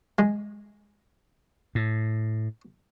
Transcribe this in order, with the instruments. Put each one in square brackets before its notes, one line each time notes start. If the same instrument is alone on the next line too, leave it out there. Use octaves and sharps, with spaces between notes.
[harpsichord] G#3
[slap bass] A2